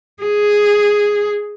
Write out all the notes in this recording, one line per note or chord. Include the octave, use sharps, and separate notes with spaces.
G#4